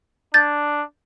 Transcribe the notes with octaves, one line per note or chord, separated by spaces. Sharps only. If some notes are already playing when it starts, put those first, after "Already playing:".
D4 G6 A6